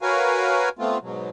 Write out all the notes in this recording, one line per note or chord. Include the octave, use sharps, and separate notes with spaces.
F#4 A#4 B4 C#5 F5 G#5
A3 B3 C4 F4
G#2 B2 F#3